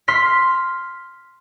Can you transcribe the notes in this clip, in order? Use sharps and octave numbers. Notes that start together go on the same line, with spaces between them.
C6 F6 B6